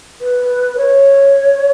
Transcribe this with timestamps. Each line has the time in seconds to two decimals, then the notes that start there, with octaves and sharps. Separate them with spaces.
0.21 B4
0.78 C#5